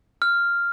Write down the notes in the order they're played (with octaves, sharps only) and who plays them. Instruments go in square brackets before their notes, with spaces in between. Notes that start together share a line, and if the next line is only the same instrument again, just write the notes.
[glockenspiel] F6